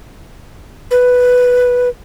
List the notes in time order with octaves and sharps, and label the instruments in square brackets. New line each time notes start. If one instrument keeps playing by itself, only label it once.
[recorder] B4